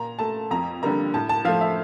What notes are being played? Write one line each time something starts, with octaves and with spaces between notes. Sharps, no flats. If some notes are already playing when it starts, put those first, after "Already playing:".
Already playing: A#2 A#5
A3 A5
F2 A#5
D3 G3 A#3 A#5
A2 A5
A5
F3 A3 F5
E5